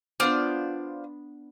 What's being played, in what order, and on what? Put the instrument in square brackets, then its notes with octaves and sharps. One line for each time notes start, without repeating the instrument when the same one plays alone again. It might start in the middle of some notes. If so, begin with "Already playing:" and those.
[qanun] B3 D4 [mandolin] F4 C5 D5